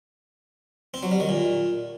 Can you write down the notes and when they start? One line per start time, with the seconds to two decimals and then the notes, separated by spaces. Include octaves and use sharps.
0.94 C4
1.03 F#3
1.11 G3
1.20 D#3
1.29 A#2